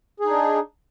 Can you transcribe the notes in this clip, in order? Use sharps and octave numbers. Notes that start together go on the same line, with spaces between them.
D4 D#4 G#4